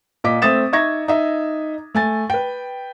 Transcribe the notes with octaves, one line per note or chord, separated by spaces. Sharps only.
A#2 D#5 D6 B6
A3 C4 E5 D#6 A6 E7
D#4 E5 C#6 G#6 A#6
D#4 E5
A3 G#5 A6
B4 G5